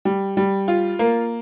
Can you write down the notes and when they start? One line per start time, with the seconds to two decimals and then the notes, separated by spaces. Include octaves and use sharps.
0.05 G3
0.37 G3
0.68 F4
0.99 A#3